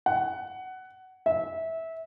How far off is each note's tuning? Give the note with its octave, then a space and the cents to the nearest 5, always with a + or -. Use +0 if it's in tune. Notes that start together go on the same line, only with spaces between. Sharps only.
F#5 +15
E5 -20